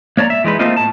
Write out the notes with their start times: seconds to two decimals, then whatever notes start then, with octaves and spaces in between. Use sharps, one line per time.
0.17 A#3 C#5 D5 A5 A#5
0.30 E5
0.44 E3 G#3 D#4 B4
0.59 A3 A#3 C4 D#4 F4 D#5
0.76 A2 A5